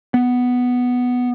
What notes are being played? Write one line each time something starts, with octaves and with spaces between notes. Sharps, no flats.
B3